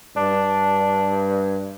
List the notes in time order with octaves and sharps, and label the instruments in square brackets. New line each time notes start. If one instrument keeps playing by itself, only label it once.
[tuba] G2 [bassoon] D4